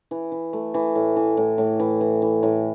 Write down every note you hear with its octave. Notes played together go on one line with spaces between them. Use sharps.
E3
E3
A3
E3
A2
E3
A2
A2
E3
E3
E3
A2